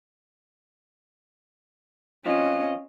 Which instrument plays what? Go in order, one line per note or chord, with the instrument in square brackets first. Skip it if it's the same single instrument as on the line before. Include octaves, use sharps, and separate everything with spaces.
[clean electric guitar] F2 F3 F4 [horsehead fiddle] C#4 D#5